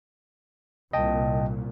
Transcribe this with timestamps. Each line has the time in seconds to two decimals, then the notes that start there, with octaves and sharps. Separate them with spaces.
0.93 C2 A#2 D#5 G5 A5